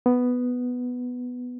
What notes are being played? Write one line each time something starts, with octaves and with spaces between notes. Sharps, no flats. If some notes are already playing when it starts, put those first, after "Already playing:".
B3